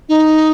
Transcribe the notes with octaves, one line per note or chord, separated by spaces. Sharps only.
D#4